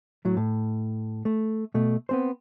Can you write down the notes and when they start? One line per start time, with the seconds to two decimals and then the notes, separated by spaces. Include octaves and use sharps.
0.25 A2 F#3
0.37 A2
1.25 A3
1.74 B2 A3
2.09 B3 C4 C5